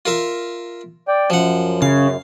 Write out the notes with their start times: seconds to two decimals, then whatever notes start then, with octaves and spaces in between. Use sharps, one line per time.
0.06 F4 A#4 E5
1.08 D5 G5
1.30 F#2 F3 F#5
1.82 C#3 F5